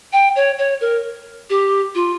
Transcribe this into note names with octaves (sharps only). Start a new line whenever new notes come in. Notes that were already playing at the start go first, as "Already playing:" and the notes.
G5
C#5
C#5
A#4
G4
F4